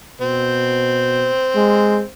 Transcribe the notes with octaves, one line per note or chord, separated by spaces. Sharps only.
B2 C4
G#3